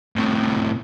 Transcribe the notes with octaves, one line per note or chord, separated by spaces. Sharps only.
A2 C3